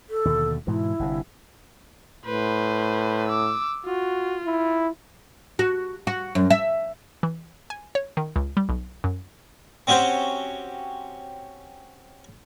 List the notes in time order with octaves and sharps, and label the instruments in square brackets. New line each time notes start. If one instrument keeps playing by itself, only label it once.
[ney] A4
[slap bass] D#2 B2 D3
[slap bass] G#2 B2 E3 [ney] E4
[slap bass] G1 G2 C3
[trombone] A2 [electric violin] B4 C5
[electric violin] D6 E6
[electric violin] F4 [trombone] F#4
[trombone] E4
[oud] F#4
F#4
F#2
E5
[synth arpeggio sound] E3
G#5
C#5
D#3
C#2
G3
B1
F#2
[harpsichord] C4 C#4 F#4 G4 C5